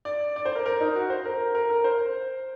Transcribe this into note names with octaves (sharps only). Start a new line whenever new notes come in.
D5
D5
C5
A#4
A#4
D#4
F#4
C5
A#4
A#4
A#4
C5